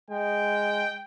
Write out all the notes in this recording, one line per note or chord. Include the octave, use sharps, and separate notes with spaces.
G#3 G5